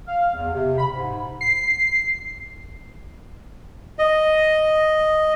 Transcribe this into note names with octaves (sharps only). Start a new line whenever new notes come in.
F5
E2
C3
B5
G#2
C7
D#5